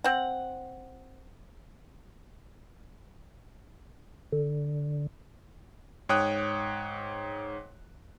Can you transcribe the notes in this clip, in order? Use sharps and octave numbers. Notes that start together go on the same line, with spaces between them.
C4 F#5
D3
G#2 C#5 G5 D#6 F#6